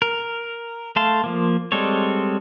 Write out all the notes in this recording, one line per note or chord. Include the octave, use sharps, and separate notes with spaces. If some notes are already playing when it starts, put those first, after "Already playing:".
A#4
A3 F5 A5 C6
F3 A#3
G3 G#3 C4 A4 C#5